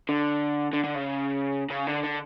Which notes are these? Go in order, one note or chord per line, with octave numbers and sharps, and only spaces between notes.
D3
D3
D3
C#3
C#3
D3
D3